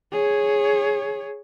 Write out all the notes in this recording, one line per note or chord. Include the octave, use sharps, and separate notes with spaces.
G#4 C#5